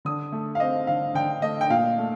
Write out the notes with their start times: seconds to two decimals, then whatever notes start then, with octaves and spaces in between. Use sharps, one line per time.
0.05 D3 D#6
0.32 A3
0.55 F5
0.60 C4 D#5
0.87 D3 F5
1.15 D3 G5
1.42 A3 D#5
1.61 G5
1.70 A#2 F5
1.98 A3